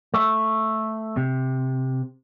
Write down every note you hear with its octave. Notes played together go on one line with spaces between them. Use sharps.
A3
C3